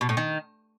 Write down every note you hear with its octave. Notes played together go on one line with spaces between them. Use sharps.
B2
A2
D#3